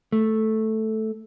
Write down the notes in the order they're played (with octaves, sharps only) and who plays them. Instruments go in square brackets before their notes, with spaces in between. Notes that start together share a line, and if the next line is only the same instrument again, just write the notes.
[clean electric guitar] A3